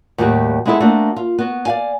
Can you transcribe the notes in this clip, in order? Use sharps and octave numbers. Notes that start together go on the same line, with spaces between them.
D#2 A2 G3 F#4 G4
G#3 B3 D#4 E4 G#4 A4
A3 A#3 C4 D4 F#4
F4
B3 F#4
D5 F5 G#5